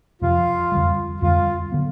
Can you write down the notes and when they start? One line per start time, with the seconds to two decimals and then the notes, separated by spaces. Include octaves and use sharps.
0.22 F2 C3 F3 F4
0.72 F2 D3 G3
1.21 F2 D3 G3 F4
1.72 D3 F#3 B3